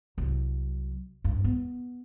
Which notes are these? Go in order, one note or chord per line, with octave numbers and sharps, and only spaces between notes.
C2 F#3
G2
B3